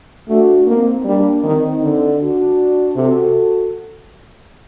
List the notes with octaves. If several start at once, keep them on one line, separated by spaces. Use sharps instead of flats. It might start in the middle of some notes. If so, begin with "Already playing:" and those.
A3 D4 F#4
A#3 C4 D#4
G3 A#3 D4
D#3 C4 D#4
D3
D4 F#4
C3 F#4 A4